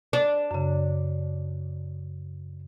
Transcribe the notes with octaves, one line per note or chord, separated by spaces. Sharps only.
D4
F#2 C#3